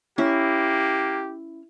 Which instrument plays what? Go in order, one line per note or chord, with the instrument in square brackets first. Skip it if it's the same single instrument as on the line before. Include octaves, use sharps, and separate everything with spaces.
[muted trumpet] A#3 [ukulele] C#4 [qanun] E4 [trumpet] G4